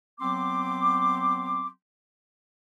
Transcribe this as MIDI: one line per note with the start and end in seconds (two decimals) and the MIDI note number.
0.20 1.68 54
0.20 1.68 59
0.20 1.68 60
0.20 1.68 84
0.20 1.68 86